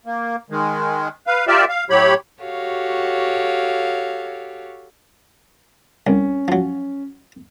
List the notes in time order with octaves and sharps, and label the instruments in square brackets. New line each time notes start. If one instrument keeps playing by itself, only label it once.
[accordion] A#3
D#3 G#3
B4 F5
F4 G4 A#4 D5 E5
F5
A2 F#3 G4 C#5 B5
[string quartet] F#4 G4 A4 C#5 F5
[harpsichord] C2 [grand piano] C#4
[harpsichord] F3 F#3